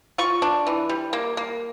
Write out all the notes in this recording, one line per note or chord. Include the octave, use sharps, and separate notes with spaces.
F4 C#6
D4
E3
G3
A#3
A#3